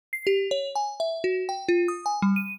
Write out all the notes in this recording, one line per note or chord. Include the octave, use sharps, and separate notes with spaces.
C7
G4
C#5
G#5
E5
F#4
G5
F4
D#6
G#5
G3
D#7